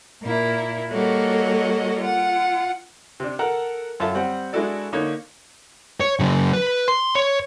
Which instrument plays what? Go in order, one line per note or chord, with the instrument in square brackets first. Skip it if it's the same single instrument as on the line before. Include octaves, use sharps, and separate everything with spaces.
[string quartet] A#2 A#3 E4
G3 A#3 F#4 A4 C#5 D#5
F4 F#5
[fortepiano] C3 D4
A4 A#4 F#5 F#6
F#2 F4 A4 E5 A5
G3 C4 F#5
G#3 D4 E4 F#4 A4 D5
D3 A#3 D#4 C#5
[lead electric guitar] C#5
C#3 F#3
B4
C6
C#5